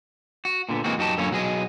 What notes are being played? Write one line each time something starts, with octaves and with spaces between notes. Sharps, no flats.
F#4
A#2 D3 B3
A#2 E3 G#3 A#3 C4 F#4
F#2 D#4 F#4 G4 A5
F#2 A#2 D3 A#3 C#4 C#5
B1 F#4 G#4 D#5